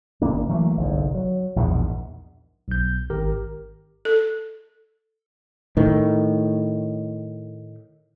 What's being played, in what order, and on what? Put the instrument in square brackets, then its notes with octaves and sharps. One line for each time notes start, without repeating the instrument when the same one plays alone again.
[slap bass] G#1 C#3 A#3 D4
E3 F#3 A3 A#3
G1 C2 G#2
F#3
A#1 E2 G#2 B2
[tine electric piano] B1 G6
G#1 G4 A#4
[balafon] A4
[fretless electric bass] A2 D#3